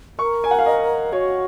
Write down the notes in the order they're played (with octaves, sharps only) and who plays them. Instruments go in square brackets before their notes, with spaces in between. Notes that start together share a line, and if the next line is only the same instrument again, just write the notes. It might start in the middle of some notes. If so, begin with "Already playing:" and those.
[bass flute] A#4 [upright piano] C#6
[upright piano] G#5
F#5
F5
D#5
[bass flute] F#4 [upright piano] C#5